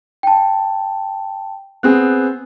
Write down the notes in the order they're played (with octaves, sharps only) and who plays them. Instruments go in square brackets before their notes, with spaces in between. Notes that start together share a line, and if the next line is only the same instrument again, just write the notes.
[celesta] G5 A5
[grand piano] B3 C4 G#4 [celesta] F#6